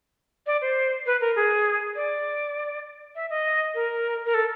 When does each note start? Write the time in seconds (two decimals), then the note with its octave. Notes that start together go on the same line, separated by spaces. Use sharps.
0.47 D5
0.62 C5
1.06 B4
1.21 A#4
1.36 G#4
1.96 D5
3.15 E5
3.30 D#5
3.75 A#4
4.26 A#4
4.34 A4